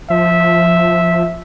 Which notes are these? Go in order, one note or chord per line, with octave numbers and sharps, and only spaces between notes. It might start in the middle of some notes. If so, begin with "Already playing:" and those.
F3 E5